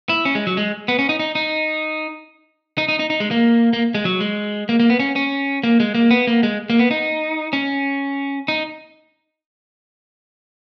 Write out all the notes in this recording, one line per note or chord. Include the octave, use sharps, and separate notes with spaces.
E4
C#4
G#3
F#3
G#3
B3
C#4
D#4
D#4
D#4
D#4
D#4
D#4
D#4
G#3
A#3
A#3
G#3
F#3
G#3
A#3
A#3
B3
C#4
C#4
A#3
G#3
A#3
B3
A#3
G#3
A#3
B3
D#4
C#4
D#4